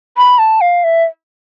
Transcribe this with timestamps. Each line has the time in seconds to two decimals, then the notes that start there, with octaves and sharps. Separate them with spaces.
0.17 B5
0.39 A5
0.61 F5
0.84 E5